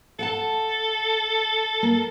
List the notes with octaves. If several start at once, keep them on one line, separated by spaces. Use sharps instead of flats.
A4 F#5 G5 A5
A#3